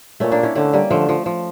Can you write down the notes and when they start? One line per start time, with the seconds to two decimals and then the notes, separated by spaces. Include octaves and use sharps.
0.20 A#2 A3 C#4
0.31 A#3 D4
0.43 C#4 E4
0.55 D3 A3 C#4
0.73 G3 A#3
0.90 D3 F3 A3
1.09 F3
1.26 F3